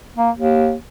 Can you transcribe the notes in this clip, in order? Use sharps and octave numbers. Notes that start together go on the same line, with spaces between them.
A#3
D#2